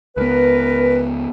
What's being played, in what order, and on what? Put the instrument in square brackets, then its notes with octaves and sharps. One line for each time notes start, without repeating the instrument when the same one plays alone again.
[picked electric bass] C#2 B3 [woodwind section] A#4 B4